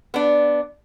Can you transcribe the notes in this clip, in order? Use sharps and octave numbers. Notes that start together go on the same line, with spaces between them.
B3 D4